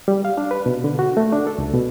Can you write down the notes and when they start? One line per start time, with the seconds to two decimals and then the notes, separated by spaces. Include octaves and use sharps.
0.08 G3
0.25 F5
0.38 D4
0.51 B4
0.66 B2
0.84 D3
0.99 F#4
1.17 A3
1.32 D4
1.47 A4
1.58 C#2
1.74 B2